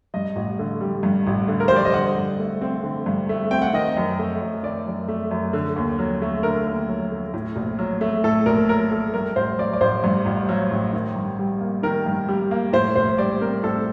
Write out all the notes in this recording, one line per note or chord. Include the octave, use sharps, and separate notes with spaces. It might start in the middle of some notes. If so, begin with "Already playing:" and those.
G2 D#5
A1
D3
G3
G2
A1
D3
A#4
G3 C5
D5
D#5
D3 F#5
G2
A3
C4
D3
G2
A3
C4 G5
F#5
D#3 D#5
F#2
A3
F#2
D#3 D5
F#2
A3
F#2
D3
D#2
F#3
A3
D3 A#4
D#2
F#3
A3
A2
A#1
F#3
A3
A2 A4
A#1 A#4
F#3 A#4
A3 A4
G2 A#4
A1 C5
F#3 D5
D5
A1 C5
G2
A1
F#3
A1
D#3
G2
G3
A#3
D#3 A#4
G2
G3
A#3
A2 C5
A#1 C5
G3 D5
C4 A#4
A2 A4